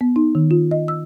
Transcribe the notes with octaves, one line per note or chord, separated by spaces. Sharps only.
B3
D#4
D#3
F4
D#5
E6